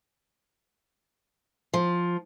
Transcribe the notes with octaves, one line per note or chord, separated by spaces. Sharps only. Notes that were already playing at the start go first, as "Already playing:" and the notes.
F3